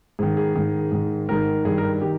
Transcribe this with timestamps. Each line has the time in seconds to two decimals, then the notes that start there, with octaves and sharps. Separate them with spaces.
0.19 G#2 D#3 G#4
0.37 G#4
0.55 G#2 D#3
0.92 G#2 D#3
1.29 G#2 D#3 A#4
1.65 G2 D#3 G#4
1.78 A#4
2.01 D#3 G4